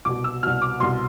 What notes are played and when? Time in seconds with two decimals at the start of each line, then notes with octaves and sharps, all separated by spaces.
0.05 C2 B2 D6
0.24 E6
0.43 C2 B2 F6
0.62 D6
0.80 C2 B2 C6